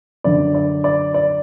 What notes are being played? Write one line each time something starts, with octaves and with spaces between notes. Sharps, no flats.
F#2 D3 D5
D5
D5
D5